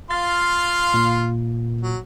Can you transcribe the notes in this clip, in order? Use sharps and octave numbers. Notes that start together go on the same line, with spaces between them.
F4 F5 C6 A6
A#2 A#3
F#3